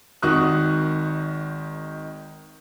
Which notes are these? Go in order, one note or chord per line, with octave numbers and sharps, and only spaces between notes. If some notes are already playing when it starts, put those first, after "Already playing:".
G#1 D#3 F#4 C#6 D#6 F#6